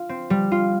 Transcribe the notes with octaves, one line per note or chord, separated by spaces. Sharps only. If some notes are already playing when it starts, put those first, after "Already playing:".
Already playing: F4
C4
G3
F4